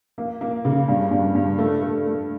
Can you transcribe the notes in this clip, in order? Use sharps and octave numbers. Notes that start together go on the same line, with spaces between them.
A#3
A#3
C#3
G2
G2
G2
A3
A3
A3